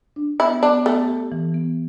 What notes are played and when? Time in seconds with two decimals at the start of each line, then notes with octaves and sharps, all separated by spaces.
0.16 D4
0.39 B3 E4
0.62 B3 D4
0.85 A3 B3
1.08 G4
1.32 E3
1.54 B3